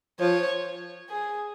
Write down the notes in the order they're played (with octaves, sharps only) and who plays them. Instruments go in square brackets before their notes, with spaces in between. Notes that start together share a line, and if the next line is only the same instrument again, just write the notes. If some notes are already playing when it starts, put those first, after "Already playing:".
[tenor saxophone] F3 [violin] C#5
[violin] G#4